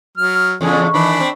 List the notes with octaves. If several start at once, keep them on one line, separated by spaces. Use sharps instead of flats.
F#3 F6
E2 A2 C#3 G#4
D#3 E3 D4 B5
C4